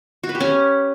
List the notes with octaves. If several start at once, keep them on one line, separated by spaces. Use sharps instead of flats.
F#4
B4
G4
C#4